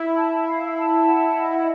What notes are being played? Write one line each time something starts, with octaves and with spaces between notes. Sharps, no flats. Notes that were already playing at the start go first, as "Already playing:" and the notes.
Already playing: E4
A5
F5
A5
F#5
D#5